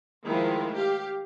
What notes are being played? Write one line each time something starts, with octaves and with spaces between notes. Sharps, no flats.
D#3 F3 G#3 A3 E4 F4
G4 F5